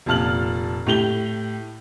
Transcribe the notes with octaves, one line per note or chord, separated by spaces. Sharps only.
F1 A#2 A5 F6 F#7
A2 G4 F7 G7